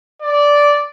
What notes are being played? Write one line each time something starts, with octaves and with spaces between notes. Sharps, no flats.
D5